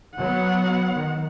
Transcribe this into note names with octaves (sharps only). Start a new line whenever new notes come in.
F#3 B3 F#5
D#3